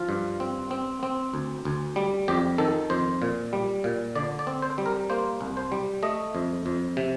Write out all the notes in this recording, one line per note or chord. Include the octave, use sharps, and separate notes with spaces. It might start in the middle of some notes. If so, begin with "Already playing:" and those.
Already playing: F3 F4
G2
C4
C4
C4
D2
D2
G3
F2 G4
D#3 A4
F2 C5
A#2
G3
A#2
D3 D5
D5
C4
C5
G3
A#4
A#3 C5
C2
C5
G3
A3 D#5
F2
F2
C3